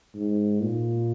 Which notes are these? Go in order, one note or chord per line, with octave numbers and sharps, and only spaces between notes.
G#2
A#2